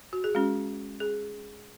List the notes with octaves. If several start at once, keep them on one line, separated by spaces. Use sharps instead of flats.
F#4
G#4
G#3 C#4 F#4
G#4